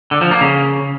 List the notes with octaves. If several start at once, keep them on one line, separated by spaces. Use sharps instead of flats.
D3
F3
A#3
C#3